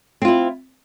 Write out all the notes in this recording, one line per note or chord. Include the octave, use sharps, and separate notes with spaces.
C4 E4 F4